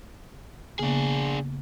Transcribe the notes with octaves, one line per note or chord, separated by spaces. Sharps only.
C#3 A#3 B3 D4 G#4